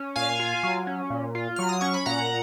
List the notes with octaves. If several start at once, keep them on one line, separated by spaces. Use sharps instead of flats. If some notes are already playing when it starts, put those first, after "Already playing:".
Already playing: C#4
A#2 F5 G#5
F4
F#3
C#4
A#2
F4
F#3 F6
D#6
C#4 C#6
B5
A#2 F#5 A#5